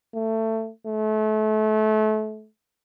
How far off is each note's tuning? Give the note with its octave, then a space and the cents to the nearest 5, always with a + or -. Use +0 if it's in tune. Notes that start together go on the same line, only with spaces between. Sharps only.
A3 +20
A3 -30